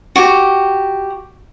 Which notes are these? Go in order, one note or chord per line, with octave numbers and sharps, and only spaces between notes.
F#4 G4